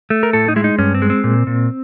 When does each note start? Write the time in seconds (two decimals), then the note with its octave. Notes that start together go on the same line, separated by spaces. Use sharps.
0.10 A3
0.23 A#4
0.33 A2 A4
0.48 D#4
0.56 G#3 E4
0.64 D#4
0.79 G2 C#4
0.95 C4
1.02 G#3
1.10 C4
1.24 A#2
1.47 A#2